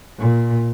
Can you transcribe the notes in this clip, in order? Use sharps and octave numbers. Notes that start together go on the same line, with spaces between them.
A#2